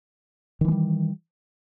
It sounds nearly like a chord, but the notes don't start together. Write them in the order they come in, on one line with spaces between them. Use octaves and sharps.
D#3 E3 G#3 G3